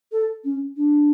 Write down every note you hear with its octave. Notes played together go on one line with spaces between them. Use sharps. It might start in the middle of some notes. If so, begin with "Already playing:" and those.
A4
C#4
D4